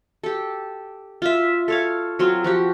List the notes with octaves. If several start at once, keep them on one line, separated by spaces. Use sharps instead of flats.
G4 A4
F4 E5
A4 C#5 F5
F#3 C4 F4
F3 F#4 G4